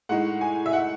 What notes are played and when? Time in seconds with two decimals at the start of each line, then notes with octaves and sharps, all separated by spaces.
0.09 A2 G#3 D#4 F#5
0.41 G#5
0.66 E5
0.73 F#5